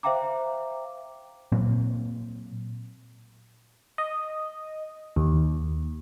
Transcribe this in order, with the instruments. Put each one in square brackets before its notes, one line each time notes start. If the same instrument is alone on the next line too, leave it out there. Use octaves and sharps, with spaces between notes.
[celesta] C5 E5 F5 G5 A#5 D6
[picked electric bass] A#2 F#3 A#3 C4
[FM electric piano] D#5
D#2